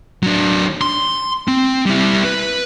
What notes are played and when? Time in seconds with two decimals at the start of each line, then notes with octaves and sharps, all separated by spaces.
0.23 F#3 D4
0.81 C6
1.48 C4
1.86 G3 E4
2.25 B4